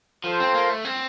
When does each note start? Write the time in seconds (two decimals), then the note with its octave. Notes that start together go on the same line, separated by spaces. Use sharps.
0.24 F3 F4 A4 C5
0.40 C4
0.54 A#3
0.70 A3
0.85 C4